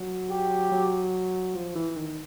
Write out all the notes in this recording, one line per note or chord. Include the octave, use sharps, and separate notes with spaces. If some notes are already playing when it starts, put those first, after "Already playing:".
Already playing: F#3
G4
F#3
F3
E3
D#3